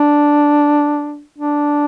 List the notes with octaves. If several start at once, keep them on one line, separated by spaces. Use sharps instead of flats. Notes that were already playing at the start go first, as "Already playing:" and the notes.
Already playing: D4
D4